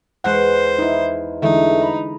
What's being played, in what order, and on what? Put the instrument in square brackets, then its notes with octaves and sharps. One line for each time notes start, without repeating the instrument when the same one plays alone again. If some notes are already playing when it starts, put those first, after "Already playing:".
[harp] E2 C#6 C7 [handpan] G#3 F#5 [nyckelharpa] C5
[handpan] D#4 E4
[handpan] D3 E3 G#3 [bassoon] A3 [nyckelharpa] D#4
[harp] D#5 A#5 B5